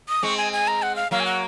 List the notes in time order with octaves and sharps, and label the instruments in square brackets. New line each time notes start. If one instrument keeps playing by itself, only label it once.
[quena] D#6
[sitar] G#3 C4 [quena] C#6
[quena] G#5
G#5
A#5
F#5
F5
[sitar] F#3 A#3 [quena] F5
[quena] G#5
F#5